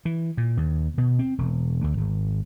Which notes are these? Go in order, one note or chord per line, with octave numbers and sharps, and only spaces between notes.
E3
A#2
D#2
B2
C4
E1
D2
G#1